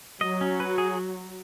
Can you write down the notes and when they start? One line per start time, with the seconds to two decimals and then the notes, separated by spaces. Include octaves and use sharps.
0.21 F#3 D#5
0.41 C#4
0.60 B4
0.78 G#4